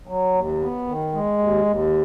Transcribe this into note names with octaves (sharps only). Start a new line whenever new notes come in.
F#3
D#2
B3
D#3
G#3
D#2
D#2